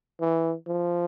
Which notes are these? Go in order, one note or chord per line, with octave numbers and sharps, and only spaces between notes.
E3
F3